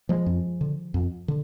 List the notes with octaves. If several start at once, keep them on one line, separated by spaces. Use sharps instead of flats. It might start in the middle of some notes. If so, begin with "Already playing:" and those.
F3 G#3
F2
D3
F2
D3